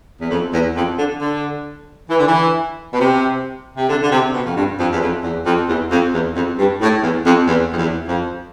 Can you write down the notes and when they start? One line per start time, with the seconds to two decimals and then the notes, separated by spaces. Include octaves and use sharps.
0.21 E2
0.31 F2
0.53 E2
0.76 F2
0.99 D3
1.20 D3
2.10 E3
2.19 D3
2.28 E3
2.93 B2
3.00 C3
3.77 C3
3.89 D3
4.03 D3
4.12 C3
4.34 B2
4.46 F2
4.57 G2
4.80 F2
4.93 E2
5.02 F2
5.23 E2
5.46 F2
5.69 E2
5.91 F2
6.14 E2
6.36 F2
6.59 G2
6.81 A2
7.03 E2
7.26 F2
7.48 E2
7.73 F2
7.79 E2
8.07 F2